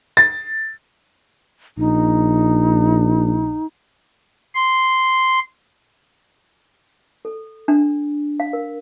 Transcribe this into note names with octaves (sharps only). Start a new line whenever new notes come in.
A6
A#1 D#4
C6
A4
D4
F5
A#4